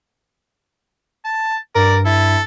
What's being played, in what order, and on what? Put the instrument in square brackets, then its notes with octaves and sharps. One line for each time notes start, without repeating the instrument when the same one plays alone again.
[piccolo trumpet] A5
[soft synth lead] G2 [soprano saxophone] A#4 [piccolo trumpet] D5
[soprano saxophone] E4 [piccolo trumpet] A4